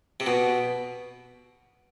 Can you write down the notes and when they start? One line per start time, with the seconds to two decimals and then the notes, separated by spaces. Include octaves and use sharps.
0.20 C3
0.27 B2